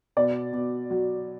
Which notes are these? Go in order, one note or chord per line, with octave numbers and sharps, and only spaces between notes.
B2 D5
B2
F#3